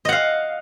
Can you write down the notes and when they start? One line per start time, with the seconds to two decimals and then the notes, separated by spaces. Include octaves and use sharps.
0.05 D#5
0.09 F#5
0.12 F5